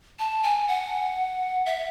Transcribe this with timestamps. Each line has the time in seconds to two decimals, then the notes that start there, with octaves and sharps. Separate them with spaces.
0.19 A5
0.43 G#5
0.68 F#5
1.66 E5